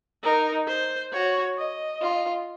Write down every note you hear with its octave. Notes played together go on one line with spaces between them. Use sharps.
D#4 A#4
C5
F#4 C#5
D#5
F4